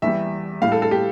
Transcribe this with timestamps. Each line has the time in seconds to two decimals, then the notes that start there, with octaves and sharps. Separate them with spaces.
0.02 E2 E3 G3 E5
0.62 A2 G3 F5
0.72 A4
0.82 A4
0.91 G4